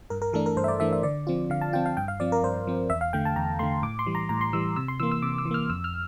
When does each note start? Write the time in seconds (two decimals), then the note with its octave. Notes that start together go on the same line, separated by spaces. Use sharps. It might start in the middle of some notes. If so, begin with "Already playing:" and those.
0.10 G2 A#4
0.22 A#4
0.33 E3 A3 D4 A4
0.46 A#4
0.57 G2 C5
0.64 E5
0.68 D5
0.80 E3 A3 D4 E5
0.93 E5
1.03 D3 D5
1.27 F3 C4 F4
1.50 D3 F5
1.61 A5
1.73 F3 C4 F4 G5
1.86 F5
1.97 G2 G5
2.08 F5
2.20 F3 C4 D5
2.32 A#4
2.43 G2 C5
2.67 F3 C4
2.90 E2 E5
3.01 F5
3.13 D3 A3 G5
3.25 A5
3.36 E2 A#5
3.59 D3 A3 C6
3.82 A2 D6
3.99 C6
4.06 E3 G3
4.15 A#5
4.29 A2 A#5
4.41 C6
4.53 E3 G3 E6
4.76 C3 E6
4.88 C6
5.00 E3 A#3 E6
5.12 E6
5.22 C3 D6
5.38 E6
5.45 E3
5.51 A#3 F6
5.70 F2 E6
5.84 F6